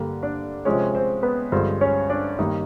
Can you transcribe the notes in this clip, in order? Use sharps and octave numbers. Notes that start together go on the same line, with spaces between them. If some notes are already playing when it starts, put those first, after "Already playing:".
Already playing: G2 D3 G3 A#3
D4 D5
C3 F3 G#3 C#4 C#5
C4 C5
B3 B4
G2 D3 F3 G#3 C4 C5
C#4 C#5
D4 D5
G2 D#3 G3 A#3 D#4 D#5